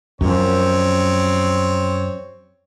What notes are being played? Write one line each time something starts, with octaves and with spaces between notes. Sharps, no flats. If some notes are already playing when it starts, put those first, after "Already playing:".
F#2 F3 C4 C#5